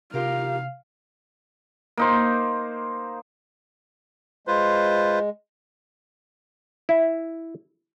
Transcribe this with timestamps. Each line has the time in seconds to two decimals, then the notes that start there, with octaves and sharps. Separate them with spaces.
0.14 C3 F4 G4 A#4 F5
1.97 A#3 D#4 C5
4.47 G#3 F4 B4 C5
6.89 E4